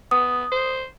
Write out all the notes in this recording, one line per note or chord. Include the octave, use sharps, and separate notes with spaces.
B3 D#6
C5